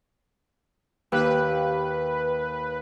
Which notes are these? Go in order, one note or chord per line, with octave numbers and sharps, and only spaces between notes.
D#2 G4 B4 F#6